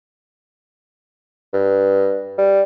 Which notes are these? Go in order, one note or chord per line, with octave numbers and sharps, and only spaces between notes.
G2
G3